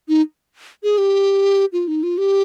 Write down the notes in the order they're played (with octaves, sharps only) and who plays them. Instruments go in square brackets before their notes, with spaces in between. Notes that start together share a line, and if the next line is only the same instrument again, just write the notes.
[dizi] D#4
G#4
G4
F4
D#4
F4
G4